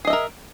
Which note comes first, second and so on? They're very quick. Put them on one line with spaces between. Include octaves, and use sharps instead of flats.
G#4 D#5 E5 A#4